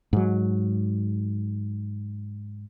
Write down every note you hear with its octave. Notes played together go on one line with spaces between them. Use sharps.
G#2 F#3